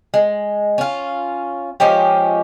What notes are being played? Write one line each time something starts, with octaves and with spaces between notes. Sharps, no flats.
G#3
C#4 F4
F3 G#3 C#4 G4